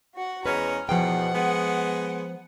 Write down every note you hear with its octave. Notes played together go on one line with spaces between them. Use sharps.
F#4 F#5
E2 G#3 C#4 B4 A#5
E2 B2 F3 F#5 G5
G#3 B3